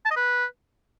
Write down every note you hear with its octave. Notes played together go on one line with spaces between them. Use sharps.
A5
D#5
B4